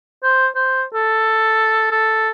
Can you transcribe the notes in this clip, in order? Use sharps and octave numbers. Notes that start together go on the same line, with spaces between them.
C5
C5
A4
A4